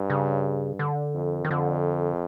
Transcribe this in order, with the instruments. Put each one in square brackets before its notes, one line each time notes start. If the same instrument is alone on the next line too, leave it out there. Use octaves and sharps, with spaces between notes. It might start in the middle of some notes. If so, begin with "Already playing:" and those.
Already playing: [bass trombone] G2
[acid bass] C#3
D3
[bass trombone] F2
[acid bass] D#3
[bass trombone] F2 [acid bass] D3